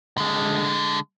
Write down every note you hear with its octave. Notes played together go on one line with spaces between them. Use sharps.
D3 G#3